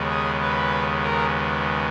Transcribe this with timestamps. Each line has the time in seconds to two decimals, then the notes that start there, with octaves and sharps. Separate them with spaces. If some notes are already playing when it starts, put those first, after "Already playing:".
Already playing: D#2 C#3 G#3 B3
0.10 G#4
0.41 B4
1.04 A#4